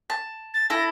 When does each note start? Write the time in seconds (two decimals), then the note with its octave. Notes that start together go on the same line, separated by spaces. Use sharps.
0.10 A5
0.54 A6
0.70 E4 A4 A#6